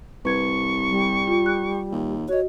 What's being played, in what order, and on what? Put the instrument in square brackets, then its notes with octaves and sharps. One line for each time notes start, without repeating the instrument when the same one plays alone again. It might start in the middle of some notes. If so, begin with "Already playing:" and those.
[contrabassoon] C2 [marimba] B4 G#6 [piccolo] C#6
[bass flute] G3
[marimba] F4
F#6
[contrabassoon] D#2
[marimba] F#4 D#5 [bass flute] C#5